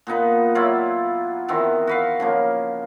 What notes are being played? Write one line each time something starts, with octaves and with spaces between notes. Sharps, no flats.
A#2 B3 D#4 B4
F#3 E4 F4 D5
D#3 E3 B3 C4
F#4 B4 F5
C#3 F3 A#3